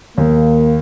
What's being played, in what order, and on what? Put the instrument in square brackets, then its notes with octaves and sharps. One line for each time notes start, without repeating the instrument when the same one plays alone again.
[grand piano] D#2 [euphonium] A#3